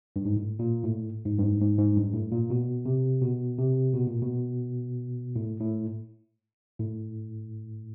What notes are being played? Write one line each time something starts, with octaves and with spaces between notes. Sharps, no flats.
G2
G#2
A2
A#2
A2
G#2
G2
G#2
G#2
G#2
G2
A2
A#2
B2
C3
B2
C3
B2
A#2
B2
A2
A2
A2